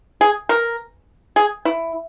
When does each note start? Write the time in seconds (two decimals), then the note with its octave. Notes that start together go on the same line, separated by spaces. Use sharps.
0.21 G#4
0.49 A#4
1.36 G#4
1.65 E4